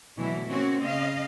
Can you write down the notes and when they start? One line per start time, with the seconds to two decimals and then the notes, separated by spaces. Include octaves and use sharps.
0.17 D2 B2 E3 F#3 E4
0.47 A#3 C4 C#4 F#4
0.86 C#3 D#5 F5